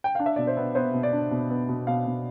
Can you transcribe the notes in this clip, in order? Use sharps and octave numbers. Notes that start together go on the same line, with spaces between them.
G5
D4 F5
E5
B2 D5
C5
B3
B3 C5
B2
D5
D4
B2
B3
B2
B2 F5
B2